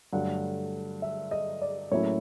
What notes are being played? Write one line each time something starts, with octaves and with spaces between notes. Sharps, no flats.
G2 D3 F#3 A3 F#5
E5
D#5
D5
A2 F#3 A#3 C#4 E4 C#5